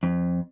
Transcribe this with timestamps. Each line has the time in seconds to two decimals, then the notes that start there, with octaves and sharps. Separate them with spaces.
0.03 F2